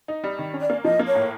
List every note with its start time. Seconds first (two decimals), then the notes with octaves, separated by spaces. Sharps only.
0.08 D#4
0.24 G3
0.39 D#3
0.54 C#4
0.61 D5
0.70 A#3
0.84 F3 D#5
0.99 A#3
1.07 C#5
1.15 A2